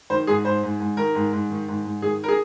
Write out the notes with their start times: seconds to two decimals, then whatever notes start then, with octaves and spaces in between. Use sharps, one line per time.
0.10 D#3 C5
0.27 G#2 G#4
0.45 G#2 C5
0.63 G#2
0.80 G#2
0.97 D#3 A#4
1.15 G#2
1.33 G#2
1.50 D#3
1.68 G#2
1.85 G#2
2.02 D#3 G#4
2.24 A#4
2.28 G#4